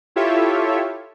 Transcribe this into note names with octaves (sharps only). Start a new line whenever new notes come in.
E4 F4 G4 A4 C#5 E5